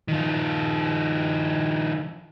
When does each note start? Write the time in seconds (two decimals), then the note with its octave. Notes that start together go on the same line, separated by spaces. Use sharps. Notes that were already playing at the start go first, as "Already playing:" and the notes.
0.08 D#3 F3